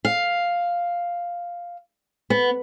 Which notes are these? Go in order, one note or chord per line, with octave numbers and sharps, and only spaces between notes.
F5
B3